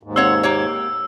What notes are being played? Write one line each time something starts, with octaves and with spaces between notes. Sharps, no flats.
D#2 G#2
C4 C#5 F#5 E6
A#3 G4 C#5